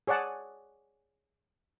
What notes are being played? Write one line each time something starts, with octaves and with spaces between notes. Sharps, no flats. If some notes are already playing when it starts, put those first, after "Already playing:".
G#4 C#5 D5 F#5 A5